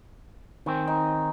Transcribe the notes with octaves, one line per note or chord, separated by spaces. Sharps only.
D#3 C4 G#5
D#4